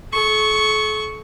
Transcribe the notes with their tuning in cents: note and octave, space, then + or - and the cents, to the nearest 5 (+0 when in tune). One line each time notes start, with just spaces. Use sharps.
A4 -45 C#6 +0